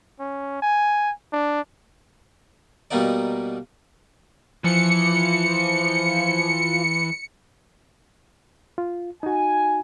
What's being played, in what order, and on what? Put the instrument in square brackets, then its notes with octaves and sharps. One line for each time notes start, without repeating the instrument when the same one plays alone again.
[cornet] C#4
G#5
D4
[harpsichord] B2 G3 A#3 B3 D#4 D5
[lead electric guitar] E3 [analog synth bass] F3 [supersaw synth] C#7
[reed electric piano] F4
[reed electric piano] D#4 F#4 [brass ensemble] G#5